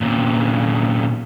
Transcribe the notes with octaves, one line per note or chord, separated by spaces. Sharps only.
E2 A#2